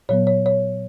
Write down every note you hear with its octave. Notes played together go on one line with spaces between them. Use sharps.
A#2 F#3 B3 C#5
C#5
C#5